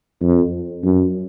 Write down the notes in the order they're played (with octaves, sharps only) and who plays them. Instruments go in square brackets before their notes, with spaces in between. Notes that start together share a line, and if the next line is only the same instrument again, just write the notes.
[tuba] F2
F#2